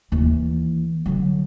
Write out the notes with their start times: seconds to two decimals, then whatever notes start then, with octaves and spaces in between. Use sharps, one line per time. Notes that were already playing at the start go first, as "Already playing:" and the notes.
0.12 D#2 E3
1.06 D3 F#3